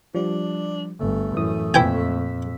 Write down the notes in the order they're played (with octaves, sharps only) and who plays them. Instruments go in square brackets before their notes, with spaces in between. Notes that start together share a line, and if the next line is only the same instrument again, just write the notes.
[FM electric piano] F3 G3 [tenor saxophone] D4
[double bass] G1 [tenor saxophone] A3
[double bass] F#2 [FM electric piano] A2 E3 D#6
[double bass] F2 [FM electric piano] A#2 E6 B6 [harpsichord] E3 G5 G#5